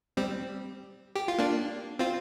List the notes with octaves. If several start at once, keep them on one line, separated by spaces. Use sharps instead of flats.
G3 C4
G4
F4
A#3 D4
C4 F4